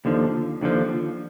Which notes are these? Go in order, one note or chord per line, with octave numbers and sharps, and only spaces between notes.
D#2 D3 F3
D#2 D3 F3